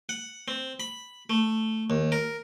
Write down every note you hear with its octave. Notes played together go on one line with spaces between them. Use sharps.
F#5
C4
B5
A3
D#2
A#4